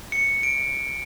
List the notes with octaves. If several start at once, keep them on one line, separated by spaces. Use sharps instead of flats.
C#7
D7